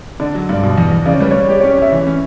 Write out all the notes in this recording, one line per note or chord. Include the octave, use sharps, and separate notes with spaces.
D3 D5
F#3
G2 D5
B2
E2
E2
C#3 D5
C#5
G3 B4
G3 C#5
G4 D5
C#5
C#4
D5
C#4 E5
E3
C#4